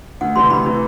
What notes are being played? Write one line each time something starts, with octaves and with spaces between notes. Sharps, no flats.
D2 F#5
C3 E3 G3 C6
D2 B5
C3 E3 G3